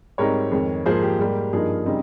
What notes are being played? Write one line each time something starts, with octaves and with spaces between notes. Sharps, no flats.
G#2 G3 C4 D#4 A#4 C#5
F2 D#3 G#3
G#2 F3 A#3 G#4 C5
G4
G#2 G3 A#3
G2 F3 A#3 D#4 G#4
C#3 G3 C4 D#4